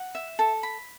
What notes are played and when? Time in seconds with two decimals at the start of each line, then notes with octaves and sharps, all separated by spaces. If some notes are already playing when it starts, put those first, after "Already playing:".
Already playing: F#5
0.15 E5
0.39 A4
0.63 B5